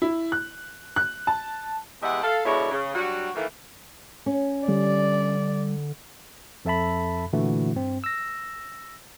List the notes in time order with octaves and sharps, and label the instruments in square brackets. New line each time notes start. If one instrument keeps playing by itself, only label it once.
[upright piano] E4
F#6
F#6
A5
[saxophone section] E2 G#3 G4 D#5 E5 F#5
A4 F5
B2 D3 G#3 E4 C#5 D5
C#3
F#3 G3 D4 F#4
D#3 E3 A3 A#3
[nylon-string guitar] C#4
[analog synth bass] D3 [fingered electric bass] G3 [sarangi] D5
[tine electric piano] F2 A4 E5 A5 B5
A#2 D3 E3 A3 E4 F#4
G2 C4
E6 A#6